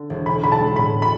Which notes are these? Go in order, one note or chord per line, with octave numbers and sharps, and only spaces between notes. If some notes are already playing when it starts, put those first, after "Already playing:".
Already playing: D3
E1
B1 B5
B1 B5
A5
G#3
A2 B5
B5